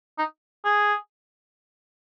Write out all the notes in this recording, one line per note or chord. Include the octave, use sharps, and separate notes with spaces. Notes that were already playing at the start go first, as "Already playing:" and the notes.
D#4
G#4